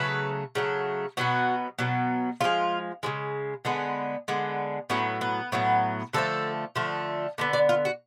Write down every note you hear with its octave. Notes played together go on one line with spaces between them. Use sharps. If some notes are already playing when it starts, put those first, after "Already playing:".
Already playing: C#3 F#3 A3 B4
C#3 F#3 A3
B2 F#3 B3 F#4
B2 F#3 B3
C#3 F3 G#3 F4
C#3 F3 G#3
D3 G#3 B3
D3 G#3 B3
A2 F#3 B3 C#4
B3
A2 F#3 B3
D3 F3 A3 A4
D3 F3 A3
D3 G#3 B3
D5
F4
F#4